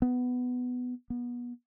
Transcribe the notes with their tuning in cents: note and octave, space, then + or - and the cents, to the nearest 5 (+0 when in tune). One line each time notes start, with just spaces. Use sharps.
B3 +10
B3 -25